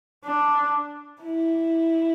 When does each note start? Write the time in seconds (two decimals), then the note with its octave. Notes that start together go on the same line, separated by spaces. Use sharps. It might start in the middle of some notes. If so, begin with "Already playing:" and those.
0.24 D4
1.22 E4